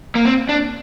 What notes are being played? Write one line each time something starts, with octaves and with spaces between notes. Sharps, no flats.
A#3
C4
D4